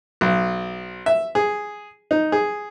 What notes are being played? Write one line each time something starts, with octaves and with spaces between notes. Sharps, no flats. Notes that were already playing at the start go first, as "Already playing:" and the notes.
B1
E5
G#4
D#4
G#4